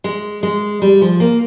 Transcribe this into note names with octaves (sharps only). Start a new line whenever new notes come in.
G#3
G#3
G3
F3
A#3